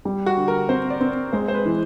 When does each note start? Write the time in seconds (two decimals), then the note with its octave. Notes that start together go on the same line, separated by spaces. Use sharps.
0.05 G3
0.26 F#4
0.37 D3
0.48 A#4
0.69 C4 C5
0.90 D5
1.01 C4
1.33 G#3 C5
1.48 C5
1.54 B4
1.65 E3